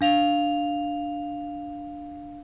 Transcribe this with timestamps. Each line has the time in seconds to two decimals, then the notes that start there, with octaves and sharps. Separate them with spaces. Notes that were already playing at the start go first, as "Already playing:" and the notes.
0.01 D4 F5 F7